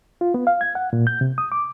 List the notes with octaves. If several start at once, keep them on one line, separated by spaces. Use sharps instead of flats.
F4
B3
F5
G#6
F#5
A#2
G6
C3
D#6
D6